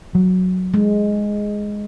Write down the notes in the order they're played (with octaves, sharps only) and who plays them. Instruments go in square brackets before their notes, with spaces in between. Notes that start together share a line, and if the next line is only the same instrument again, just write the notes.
[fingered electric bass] F#3
[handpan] G#3